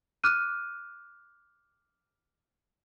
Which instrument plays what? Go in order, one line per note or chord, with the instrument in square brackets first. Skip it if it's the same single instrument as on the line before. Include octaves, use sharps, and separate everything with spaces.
[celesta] D6 F6 F#6 D#7